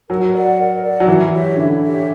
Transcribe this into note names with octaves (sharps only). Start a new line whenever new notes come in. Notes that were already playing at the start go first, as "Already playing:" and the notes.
F#3 A#4
D5 F#5
A#4
D5
F#5
F#3
E3 E4
G4 C#5 E5
D3 E4
G4 C#5 E5